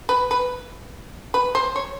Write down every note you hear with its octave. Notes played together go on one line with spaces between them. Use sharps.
B4
B4
B4
C5
C#5